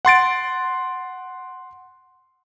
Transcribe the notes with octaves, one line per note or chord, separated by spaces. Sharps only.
F#5 C6 A6 D7